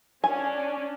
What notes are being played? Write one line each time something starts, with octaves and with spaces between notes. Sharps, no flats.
C#4 D4 G#5